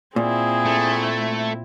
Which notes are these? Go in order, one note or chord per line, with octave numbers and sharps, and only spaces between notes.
A#2 C4 E4 G#4
A3